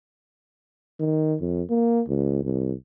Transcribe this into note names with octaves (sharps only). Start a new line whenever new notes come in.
D#3
F2
A#3
C#2
C2